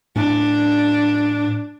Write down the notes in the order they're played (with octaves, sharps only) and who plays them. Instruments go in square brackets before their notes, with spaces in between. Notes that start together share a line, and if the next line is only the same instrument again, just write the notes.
[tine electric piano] A2 [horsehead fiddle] D4